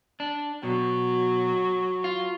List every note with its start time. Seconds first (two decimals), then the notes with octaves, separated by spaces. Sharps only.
0.20 D4
0.63 B2 F#3
2.04 F4